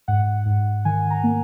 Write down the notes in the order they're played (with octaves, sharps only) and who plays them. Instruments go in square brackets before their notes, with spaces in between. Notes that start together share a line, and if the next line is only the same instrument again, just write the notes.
[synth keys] G#2 F#5
G#2
D#3 G#5
A#5
A#3